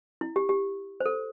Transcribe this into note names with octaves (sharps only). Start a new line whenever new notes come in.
E4
G4
G4
C5
A4